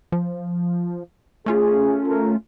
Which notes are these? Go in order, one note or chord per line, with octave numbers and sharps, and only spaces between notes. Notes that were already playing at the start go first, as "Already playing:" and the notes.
F3
A3 C#4 F4 G#4
A4 A#4